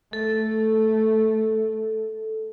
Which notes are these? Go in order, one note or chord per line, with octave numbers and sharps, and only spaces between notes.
A3 A4